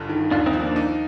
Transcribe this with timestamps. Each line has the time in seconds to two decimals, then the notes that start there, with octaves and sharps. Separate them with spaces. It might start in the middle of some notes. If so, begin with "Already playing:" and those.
Already playing: G1 G2
0.09 D#3
0.31 D#2 D4 F4
0.46 C4 D#4
0.53 F3
0.61 A#3 D4
0.76 D#4